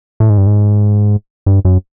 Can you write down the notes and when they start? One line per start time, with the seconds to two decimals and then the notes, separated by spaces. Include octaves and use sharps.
0.20 A2
0.30 G#2
0.38 G2
0.47 G#2
1.46 G2
1.65 F#2